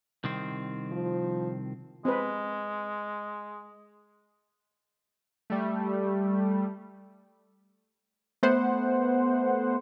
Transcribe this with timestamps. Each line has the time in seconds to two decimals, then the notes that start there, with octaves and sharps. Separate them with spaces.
0.24 C2 D#3 C4
0.91 F3
2.05 G#3 C4 B4
5.50 G3 A3
8.43 A3 B3 C5 F#5